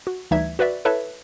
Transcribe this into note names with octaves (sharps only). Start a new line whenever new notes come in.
F#4
D2 E3 G3 D#4 E5 G#6
F#4 B4 D5 E5
E4 A4 B4 C#5 E5 A5